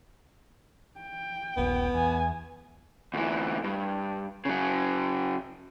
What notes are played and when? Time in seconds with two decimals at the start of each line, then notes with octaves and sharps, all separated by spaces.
1.00 G5
1.57 D#1 A#1 B3
1.95 E2 G#5
3.14 D2 E3
3.64 G2
4.45 C#3 F#3